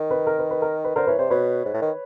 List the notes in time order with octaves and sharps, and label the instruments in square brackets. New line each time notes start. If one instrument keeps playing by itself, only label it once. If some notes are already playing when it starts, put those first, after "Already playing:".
Already playing: [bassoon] D#3
[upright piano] B4
A#4
B4
B4
A#4
B4
[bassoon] D3 [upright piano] A#4 C5
[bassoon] E3 [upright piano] B4 C#5
[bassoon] C3 [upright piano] C5 D5
[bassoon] B2 [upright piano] B4 C#5
[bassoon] G#2
A2
D#3